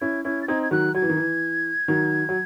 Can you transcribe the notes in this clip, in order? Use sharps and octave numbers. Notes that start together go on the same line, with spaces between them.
C#4 E4 G#6
C#4 E4 G#6
A6
C4 D#4 G#6
G#6
D#3 F#3 F#6
F#3 G#6
E3
D#3
E3
D#3 F#3
F#3